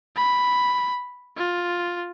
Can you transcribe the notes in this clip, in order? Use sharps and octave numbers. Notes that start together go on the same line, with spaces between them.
B5
F4